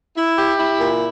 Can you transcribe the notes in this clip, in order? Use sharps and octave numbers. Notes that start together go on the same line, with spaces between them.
E4
G4
E4
A#2